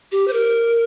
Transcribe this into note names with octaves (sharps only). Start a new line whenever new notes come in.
G4
C5
A#4